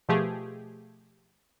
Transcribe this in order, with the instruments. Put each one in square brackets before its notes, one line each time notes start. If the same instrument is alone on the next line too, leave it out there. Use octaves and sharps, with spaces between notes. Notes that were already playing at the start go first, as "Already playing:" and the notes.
[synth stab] B2 F3 A3 G4 G#4